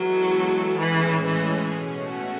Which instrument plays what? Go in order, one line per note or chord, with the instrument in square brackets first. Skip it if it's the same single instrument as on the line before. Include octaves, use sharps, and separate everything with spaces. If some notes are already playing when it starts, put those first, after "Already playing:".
Already playing: [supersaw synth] E3 G#3 B3 E4 A4 [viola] F#3
[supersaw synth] A2 G#3 C#4 G#4 [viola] E3
[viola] E3
[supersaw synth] B2 A3 C#4 F#4